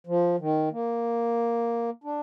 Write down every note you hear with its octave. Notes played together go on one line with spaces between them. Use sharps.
F3
D#3
A#3
D4